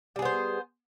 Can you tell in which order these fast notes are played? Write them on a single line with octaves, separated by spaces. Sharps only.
G3 G#4 B3 C5